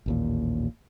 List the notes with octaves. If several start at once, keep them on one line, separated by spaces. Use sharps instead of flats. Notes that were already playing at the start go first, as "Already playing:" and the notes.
A1 D#2 A#2